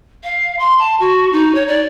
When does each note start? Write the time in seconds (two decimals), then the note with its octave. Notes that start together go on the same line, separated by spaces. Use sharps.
0.23 F5
0.59 C6
0.79 A5
0.99 F#4
1.32 D#4
1.54 C#5
1.67 D5